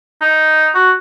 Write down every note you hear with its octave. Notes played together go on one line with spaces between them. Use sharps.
D#4
F#4